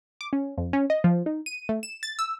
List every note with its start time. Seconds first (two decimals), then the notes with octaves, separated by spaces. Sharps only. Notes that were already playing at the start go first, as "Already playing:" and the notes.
0.21 D6
0.33 C#4
0.58 F2
0.73 C#4
0.90 D#5
1.04 F3
1.26 D#4
1.46 D#7
1.69 A3
1.83 E7
2.03 A6
2.19 E6